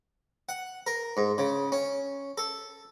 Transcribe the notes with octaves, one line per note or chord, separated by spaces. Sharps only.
F#5
A#4
G#2
C#3
C#4
A4